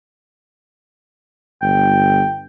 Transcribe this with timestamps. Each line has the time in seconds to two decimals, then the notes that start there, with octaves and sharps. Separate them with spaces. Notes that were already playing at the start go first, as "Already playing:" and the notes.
1.62 G1 G5